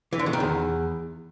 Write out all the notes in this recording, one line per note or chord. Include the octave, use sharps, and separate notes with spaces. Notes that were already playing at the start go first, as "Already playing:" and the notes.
E3
D3
B2
D#3
E2